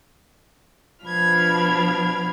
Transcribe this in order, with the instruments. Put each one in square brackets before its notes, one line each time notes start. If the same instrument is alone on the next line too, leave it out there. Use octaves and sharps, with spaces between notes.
[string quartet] B2 F3 D4 B5 F6 G#6